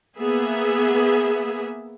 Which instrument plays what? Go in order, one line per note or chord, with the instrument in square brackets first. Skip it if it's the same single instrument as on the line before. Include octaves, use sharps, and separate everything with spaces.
[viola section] A#3 B3 G#4 E5